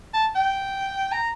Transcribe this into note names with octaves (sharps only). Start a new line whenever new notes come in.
A5
G5
A#5